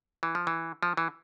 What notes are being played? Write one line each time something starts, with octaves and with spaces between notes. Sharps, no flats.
E3
F3
E3
F3
E3